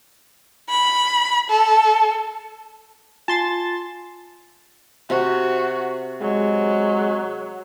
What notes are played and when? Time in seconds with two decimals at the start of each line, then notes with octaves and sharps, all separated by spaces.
0.70 B5
1.50 A4
3.28 F4 G#5 A5 C6 A6
5.10 C3 F#4
6.22 F#3 G#3